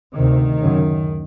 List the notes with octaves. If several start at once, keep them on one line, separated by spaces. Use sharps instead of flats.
D2 C3 D#3
F#2 C#3